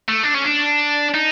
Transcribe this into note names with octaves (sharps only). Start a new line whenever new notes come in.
A3
D4
C#4
D4
D#4